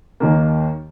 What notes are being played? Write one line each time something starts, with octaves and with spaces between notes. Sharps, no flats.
D#2 D#3 A#3